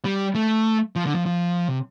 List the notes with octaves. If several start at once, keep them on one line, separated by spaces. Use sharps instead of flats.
G3
A3
F3
D3
F3
F3
C3